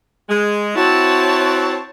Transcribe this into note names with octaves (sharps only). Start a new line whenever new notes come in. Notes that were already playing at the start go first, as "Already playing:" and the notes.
G#3
C4 E4 F#4 C#5 A5